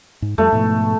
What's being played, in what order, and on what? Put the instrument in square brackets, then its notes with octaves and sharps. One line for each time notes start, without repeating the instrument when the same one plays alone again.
[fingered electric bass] G#2
[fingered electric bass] F2 G3 [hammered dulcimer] A3
[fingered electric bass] G#2 B2 F3